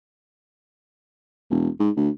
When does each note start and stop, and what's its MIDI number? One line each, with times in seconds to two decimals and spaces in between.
1.50 1.68 28
1.80 1.90 44
1.97 2.09 38